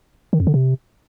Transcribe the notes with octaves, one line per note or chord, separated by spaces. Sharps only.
D#3
F2
D3
C3